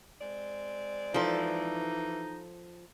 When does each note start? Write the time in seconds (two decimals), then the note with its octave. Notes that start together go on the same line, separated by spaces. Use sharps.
0.21 G#3 C4 D5
1.14 E3 F3 D#4 A4